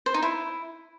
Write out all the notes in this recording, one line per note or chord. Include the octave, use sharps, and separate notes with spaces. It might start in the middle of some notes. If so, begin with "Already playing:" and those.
C5
D#4
E4